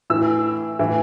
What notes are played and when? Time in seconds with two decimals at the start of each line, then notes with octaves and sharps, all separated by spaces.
0.10 A2 E3 E6
0.79 A2 E3